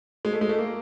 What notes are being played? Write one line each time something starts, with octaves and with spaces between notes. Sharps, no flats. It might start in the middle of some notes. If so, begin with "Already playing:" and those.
G#3
A3
G#3
A3
A#3